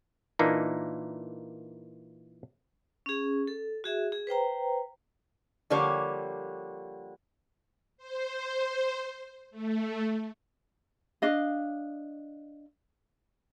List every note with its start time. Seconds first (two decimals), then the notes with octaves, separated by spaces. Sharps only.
0.39 A#2 E3 A#3 D4 D#4
3.06 C#4 G#4
3.48 A4
3.84 F#4 G#4 E5
4.12 G#4
4.27 B4 C5 G5 A#5
5.70 D3 F3 G3 A#3 G4 C#5
7.97 C5
9.51 A3
11.22 D4 D#5 F5